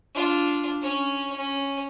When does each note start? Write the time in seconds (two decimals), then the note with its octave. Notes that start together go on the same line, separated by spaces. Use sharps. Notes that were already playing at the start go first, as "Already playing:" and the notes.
0.14 D4 F4
0.81 C#4 C#5
1.36 C#4